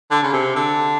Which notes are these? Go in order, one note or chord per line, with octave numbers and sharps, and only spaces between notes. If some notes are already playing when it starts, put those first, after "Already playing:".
D3
C#3
C3
D3